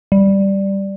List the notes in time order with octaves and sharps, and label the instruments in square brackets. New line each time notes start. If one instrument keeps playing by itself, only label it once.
[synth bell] G3